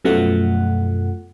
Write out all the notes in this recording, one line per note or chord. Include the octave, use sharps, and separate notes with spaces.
F#2 B2 F3 A3 F#5